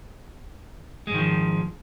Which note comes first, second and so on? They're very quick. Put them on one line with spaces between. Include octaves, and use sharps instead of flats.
G#3 G#2 D#3 F3